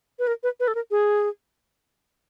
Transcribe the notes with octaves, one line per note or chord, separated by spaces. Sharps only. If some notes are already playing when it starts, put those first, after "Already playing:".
B4
A#4
B4
B4
A4
A#4
G#4